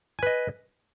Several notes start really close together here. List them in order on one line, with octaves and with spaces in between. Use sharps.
G#5 B4 D#5